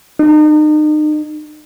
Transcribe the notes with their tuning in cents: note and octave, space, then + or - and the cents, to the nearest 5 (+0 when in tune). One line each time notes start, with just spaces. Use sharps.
D#4 -35